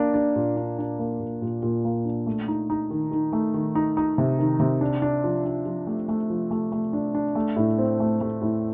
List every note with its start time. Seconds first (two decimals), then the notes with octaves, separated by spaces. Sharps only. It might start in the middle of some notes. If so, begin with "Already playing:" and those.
Already playing: A#3 D4
0.14 D4
0.36 A#2
0.57 D4
0.79 D4
0.99 A#3
1.20 A#2
1.42 A#2
1.63 A#2
1.85 A#3
2.05 D4
2.26 A3
2.48 D#4
2.70 D#4
2.91 D#3
3.11 D#3
3.33 A3
3.54 D#3
3.75 D#4
3.97 D#4
4.18 C3
4.39 D#3
4.60 C3
4.81 D4
5.02 D4
5.24 F3
5.45 D4
5.66 F3
5.87 A3
6.08 A3
6.30 F3
6.51 A3
6.72 A3
6.93 D4
7.15 D4
7.35 A3
7.56 A2
7.78 C4
8.00 A3
8.21 A3
8.41 A2